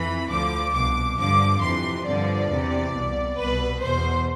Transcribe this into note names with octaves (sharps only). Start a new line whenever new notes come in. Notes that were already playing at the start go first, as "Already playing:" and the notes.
Already playing: F2 E3 B5
D2 D3 F3 D6
C2 B2 D6
G2 D3 F3 D6
F2 C3 E3 C6
G2 D3 F3 D5
E2 C3 E3
C2 B2
C2 B2 B4
E2 B2 C5